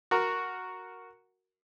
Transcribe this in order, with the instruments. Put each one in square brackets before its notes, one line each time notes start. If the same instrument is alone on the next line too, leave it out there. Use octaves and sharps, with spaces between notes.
[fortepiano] F#4 A#4